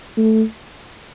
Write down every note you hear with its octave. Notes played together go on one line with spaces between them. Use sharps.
A3